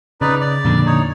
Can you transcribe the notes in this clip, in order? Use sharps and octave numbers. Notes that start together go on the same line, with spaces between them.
C#3 D#4 B4 D5
D5
F2 A#2 D3
D#4 C#5